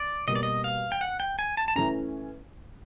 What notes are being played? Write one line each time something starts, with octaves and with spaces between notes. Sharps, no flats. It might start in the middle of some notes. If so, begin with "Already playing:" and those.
Already playing: D5
B2 G3 A#3 D#5
D5
D#5
F5
G5
F#5
G5
G#5
A5
A5
E3 A3 C#4 A#5